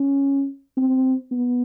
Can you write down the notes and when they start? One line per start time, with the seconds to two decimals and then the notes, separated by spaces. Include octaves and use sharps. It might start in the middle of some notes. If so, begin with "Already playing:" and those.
Already playing: C#4
0.77 C4
1.31 B3